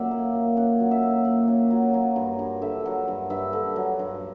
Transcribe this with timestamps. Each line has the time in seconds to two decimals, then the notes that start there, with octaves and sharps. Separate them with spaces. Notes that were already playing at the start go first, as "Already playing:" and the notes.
Already playing: A#2 F#3 C#4 D5 E5
0.11 A#3
0.35 A#2
0.56 C#4 F#5
0.80 F#3
0.91 E5
1.03 A#3
1.25 A#2 F#5
1.48 C#4
1.70 F#3
1.94 F#3
2.16 G2
2.39 G2
2.62 D3 E5
2.86 F#3
3.08 G2
3.30 G2 E5
3.53 D3
3.76 F#3
3.99 G2